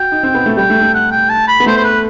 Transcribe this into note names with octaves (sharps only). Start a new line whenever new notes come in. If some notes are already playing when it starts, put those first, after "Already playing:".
Already playing: F#4 G5
D#4
C4
B3
A3
G3 G5
A3
A3
F#5
G5
A5
B5
B3
A3 C5
C5
B4